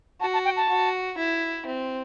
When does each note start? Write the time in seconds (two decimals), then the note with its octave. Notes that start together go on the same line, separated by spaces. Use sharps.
0.21 F#4 A5
0.33 A5
0.45 G5
0.56 A5
0.69 F#4
1.18 E4
1.66 C4